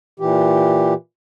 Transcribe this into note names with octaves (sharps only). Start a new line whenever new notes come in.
A#2 E3 G4